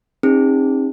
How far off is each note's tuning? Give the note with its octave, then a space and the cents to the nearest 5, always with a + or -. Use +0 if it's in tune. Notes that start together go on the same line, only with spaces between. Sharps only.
C4 +45 D#4 +0 G#4 -40